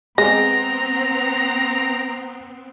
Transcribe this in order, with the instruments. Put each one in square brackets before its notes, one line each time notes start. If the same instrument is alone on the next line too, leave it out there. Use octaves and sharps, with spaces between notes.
[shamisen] G#3 [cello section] B3 C4 [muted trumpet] A#5 [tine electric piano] A#6